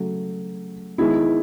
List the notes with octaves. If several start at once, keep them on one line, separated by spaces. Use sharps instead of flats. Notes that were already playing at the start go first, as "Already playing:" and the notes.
Already playing: C#3 F#3 A3
D#3 G#3 B3 E4